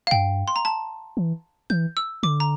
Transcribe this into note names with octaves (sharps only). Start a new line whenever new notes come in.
F5
G2 G5
C6
A#5
A5
E3
E3 G6
E6
D3 D6
A#5